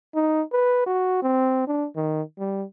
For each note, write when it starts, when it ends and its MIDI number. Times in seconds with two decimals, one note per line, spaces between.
0.15 0.42 63
0.53 0.82 71
0.86 1.22 66
1.22 1.67 60
1.67 1.87 62
1.96 2.22 51
2.39 2.65 55